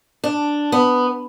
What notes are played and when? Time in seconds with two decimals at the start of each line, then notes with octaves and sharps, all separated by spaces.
0.24 D4
0.72 B3